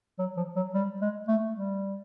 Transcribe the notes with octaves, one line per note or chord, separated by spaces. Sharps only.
F#3
F3
F#3
G3
G#3
A3
G3